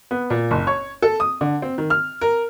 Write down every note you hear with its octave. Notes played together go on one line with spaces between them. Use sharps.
B3
A#2
F#1
C#5
A4
D#6
D3
C4
D#3
F6
A#4